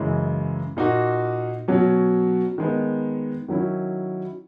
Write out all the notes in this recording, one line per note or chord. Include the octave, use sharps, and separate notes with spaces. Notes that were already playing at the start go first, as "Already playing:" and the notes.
Already playing: F#2 C#3 E3 G#3
A#2 A#3 D#4 F#4
B2 F#3 C#4
D#3 G#3 B3
D#3 F#3 C#4 E4